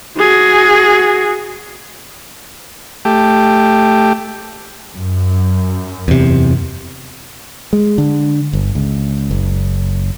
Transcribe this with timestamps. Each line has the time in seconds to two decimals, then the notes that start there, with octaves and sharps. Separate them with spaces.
0.18 F#4 G#4
3.05 A3 G4
4.94 F#2
6.08 E2 C3
7.73 G#3
7.98 D3
8.53 G1
8.75 C#2
9.31 F#1